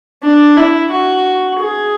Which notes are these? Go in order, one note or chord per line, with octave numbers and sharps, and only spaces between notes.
D4
E4
F#4
G#4